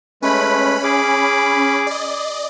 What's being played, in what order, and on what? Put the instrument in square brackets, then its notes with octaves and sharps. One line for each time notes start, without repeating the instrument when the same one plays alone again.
[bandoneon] G#3 A3 B4 [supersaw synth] C#4 B5
[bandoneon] G#4 D6
[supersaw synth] D5 D#5